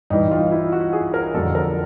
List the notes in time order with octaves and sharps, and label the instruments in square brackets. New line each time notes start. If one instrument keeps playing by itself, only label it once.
[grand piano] G2 E3 G3 D#4
F4
E4
F#4
G#4
A#4
F2 D3 F#3 A4
A#4